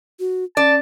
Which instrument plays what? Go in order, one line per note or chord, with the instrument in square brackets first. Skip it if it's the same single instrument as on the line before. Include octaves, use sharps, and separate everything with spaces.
[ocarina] F#4
[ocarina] C#4 [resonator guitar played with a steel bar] D5 [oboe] A5